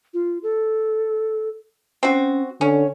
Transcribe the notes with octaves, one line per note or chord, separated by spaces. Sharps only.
F4
A4
C4 C#4 F#4
D3 C#4 C#5